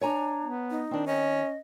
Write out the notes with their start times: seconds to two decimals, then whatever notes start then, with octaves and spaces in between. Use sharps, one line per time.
0.01 D4 C#5 G#5 A#5
0.42 B3
0.71 D#4
0.91 D#3 C4 D4
1.06 C#4 D#5